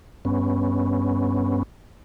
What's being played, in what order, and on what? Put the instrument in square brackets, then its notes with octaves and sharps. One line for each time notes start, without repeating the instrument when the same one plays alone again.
[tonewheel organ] G2 B3 C#4